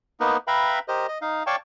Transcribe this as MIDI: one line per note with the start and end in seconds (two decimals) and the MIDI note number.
0.20 0.37 58
0.20 0.37 59
0.20 0.37 63
0.20 0.37 70
0.20 0.37 71
0.47 0.79 71
0.47 0.79 76
0.47 0.79 77
0.47 0.79 79
0.47 0.79 82
0.47 0.79 83
0.88 1.07 67
0.88 1.07 70
0.88 1.07 72
0.88 1.07 75
1.08 1.18 75
1.22 1.43 63
1.22 1.43 77
1.47 1.56 73
1.47 1.56 74
1.47 1.56 77
1.47 1.56 79
1.47 1.56 81
1.47 1.56 85